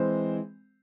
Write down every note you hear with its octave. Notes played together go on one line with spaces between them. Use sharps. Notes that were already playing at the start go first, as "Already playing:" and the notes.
Already playing: E3 G#3 C4 C5